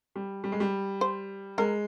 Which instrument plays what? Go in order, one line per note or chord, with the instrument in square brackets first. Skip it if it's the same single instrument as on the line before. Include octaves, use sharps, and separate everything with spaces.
[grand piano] G3
G3
G#3
G3
[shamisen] C5
[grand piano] G#3 [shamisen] A#4